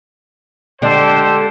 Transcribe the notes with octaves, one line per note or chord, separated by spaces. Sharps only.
D3 G#3 D4 G4 A4 C5